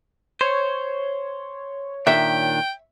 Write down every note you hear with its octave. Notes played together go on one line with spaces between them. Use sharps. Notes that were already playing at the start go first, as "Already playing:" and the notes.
C5 C#5
A#2 D#3 D4 E5 G5